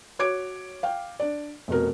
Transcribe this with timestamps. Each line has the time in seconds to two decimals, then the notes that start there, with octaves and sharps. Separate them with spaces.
0.19 F#4 C#5 D6 G#6 D7
0.83 F5 G5
1.20 D4 D5
1.68 F1 B2 A#4